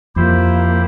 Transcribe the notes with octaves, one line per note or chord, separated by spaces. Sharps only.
F2 F3 A#3 E4 G4 C5